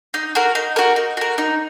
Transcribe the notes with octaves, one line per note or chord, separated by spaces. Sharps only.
D#4
F#4 A#4
D#4
F#4 A#4
D#4
F#4 A#4
D#4